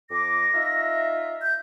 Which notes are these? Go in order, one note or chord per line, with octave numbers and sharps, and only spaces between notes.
F2 D6 A#6
D#4 F4 E5
G6